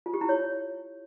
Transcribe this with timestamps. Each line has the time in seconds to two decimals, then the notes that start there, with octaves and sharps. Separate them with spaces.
0.06 F4
0.14 G4
0.21 E4
0.29 C#5